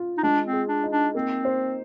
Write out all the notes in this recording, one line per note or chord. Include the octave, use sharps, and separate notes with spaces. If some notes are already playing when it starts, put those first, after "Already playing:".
Already playing: F4
D#4
G#3 D4
C4
G#4
D4
D#4
D4
A#3 C4
C5